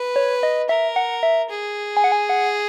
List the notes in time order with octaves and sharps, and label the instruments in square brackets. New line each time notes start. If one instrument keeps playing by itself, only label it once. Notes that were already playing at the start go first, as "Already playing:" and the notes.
Already playing: [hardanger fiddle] B4
[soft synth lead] C#5
D#5
[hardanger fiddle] A#4 [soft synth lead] E5
[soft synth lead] F#5
E5
[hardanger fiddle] G#4
[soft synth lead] G#5
F#5
G#5
F#5